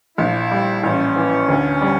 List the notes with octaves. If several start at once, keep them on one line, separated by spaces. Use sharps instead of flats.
A#1 E4
G3
A1 C#4
E3
D2
G3